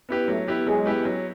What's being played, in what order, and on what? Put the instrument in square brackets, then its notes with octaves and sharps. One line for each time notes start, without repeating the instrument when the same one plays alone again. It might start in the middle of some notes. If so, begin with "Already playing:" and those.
[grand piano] B3 E4 G4 B4
[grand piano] F#3 [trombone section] A3
[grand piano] B3 E4 G4 B4
[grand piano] F#3 [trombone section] G#3
[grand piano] B3 E4 G4 B4
F#3